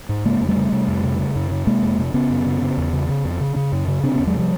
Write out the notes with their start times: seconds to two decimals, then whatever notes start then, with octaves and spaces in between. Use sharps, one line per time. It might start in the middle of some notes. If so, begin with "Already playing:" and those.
0.09 G#2
0.25 C#3 G#3 A#3
0.41 F2
0.48 G3 A3
0.56 C#3
0.72 C3
0.88 F2
1.04 C3
1.19 C#3
1.35 F#2
1.51 C#3
1.67 C3 G#3 A#3
1.82 F2
1.99 C3
2.14 C#3 B3 C#4
2.30 F#2
2.46 C#3
2.62 C#3
2.77 E2
2.93 C#3
3.09 C#3
3.25 F2
3.40 C#3
3.56 C#3
3.72 F#2
3.88 C#3
4.03 C3 C4 D4
4.16 B3 C#4
4.19 E2
4.27 F#3 G#3
4.35 C3 F3 G3